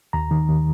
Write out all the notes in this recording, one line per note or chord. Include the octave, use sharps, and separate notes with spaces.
D#2 A#5
D#3
D#2